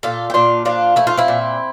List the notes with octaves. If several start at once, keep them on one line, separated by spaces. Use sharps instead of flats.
A#2 F4 A4
G4
A#2 D4 F4
F3 D4 F4
A3 E4
F4
C4 E4
A#2